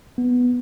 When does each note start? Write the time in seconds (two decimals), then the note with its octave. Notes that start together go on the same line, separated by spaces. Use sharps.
0.18 B3